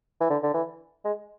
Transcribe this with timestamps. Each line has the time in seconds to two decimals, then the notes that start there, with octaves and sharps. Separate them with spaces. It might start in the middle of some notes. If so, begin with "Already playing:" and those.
0.21 E3
0.30 D3
0.43 D3
0.54 E3
1.05 G#3